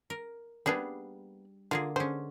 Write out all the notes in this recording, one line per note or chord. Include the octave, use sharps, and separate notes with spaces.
A#4
G3 A#3 B3 D4 G#4
D3 A#3 F4 G#4
D3 G#3 C#4 C5